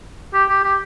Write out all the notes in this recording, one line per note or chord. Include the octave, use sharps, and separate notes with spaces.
G4
G4
G4